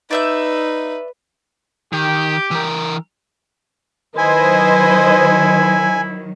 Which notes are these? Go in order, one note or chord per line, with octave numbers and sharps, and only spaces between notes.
D#4 B4 D5 E5 G6
D#3 G4
E3 A#4
D#3 F#3 E4 B4 C5 D#5 G#5